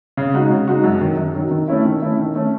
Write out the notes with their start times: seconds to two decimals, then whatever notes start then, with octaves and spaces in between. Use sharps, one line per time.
0.17 C#3
0.34 G#3 D#4 F#4
0.50 C#3
0.67 G#3 D#4 F#4
0.84 F#2
1.01 D#3 F#3
1.17 F#2
1.35 D#3 F#3
1.51 D#3
1.68 A3 C#4 E4
1.85 D#3
2.02 A3 C#4 E4
2.19 D#3
2.35 A3 C#4